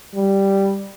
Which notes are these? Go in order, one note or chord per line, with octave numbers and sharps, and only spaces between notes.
G3